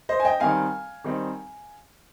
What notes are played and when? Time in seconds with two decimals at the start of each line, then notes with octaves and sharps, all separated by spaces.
0.09 C5 D#5
0.20 G#5
0.25 D#5 G5
0.40 D#3 G3 C4 D#4 F5 G#5
1.04 D#3 G3 C4 D#4